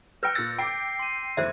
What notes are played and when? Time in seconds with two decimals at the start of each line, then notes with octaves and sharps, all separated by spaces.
0.23 B4 G5 E6 F#6 G6 A#6 C#7
0.35 A#2 E6 A6
0.58 G5 D6 C7
0.99 C6 D#7
1.37 F1 E2 C5 E5 G#6